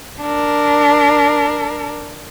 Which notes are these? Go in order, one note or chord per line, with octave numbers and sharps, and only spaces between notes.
D4 A#4